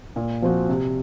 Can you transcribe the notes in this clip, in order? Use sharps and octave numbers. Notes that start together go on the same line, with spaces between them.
A#2
F3 C4 F#4
C3